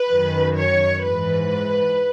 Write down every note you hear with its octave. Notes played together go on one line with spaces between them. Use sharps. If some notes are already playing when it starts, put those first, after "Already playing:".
Already playing: B4
F#2 D#3
C#5
G#2 E3 B4